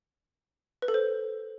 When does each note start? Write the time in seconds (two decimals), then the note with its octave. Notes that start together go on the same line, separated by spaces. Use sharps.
0.82 B4
0.88 A4
0.94 C5